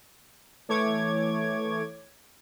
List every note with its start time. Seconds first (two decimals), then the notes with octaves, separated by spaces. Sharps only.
0.68 E3 A3 C#5 D6 G#6